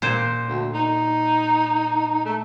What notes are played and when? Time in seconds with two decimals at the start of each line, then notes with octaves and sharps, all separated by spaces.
0.02 A#2 C5
0.48 D2
0.74 D#4
2.25 A3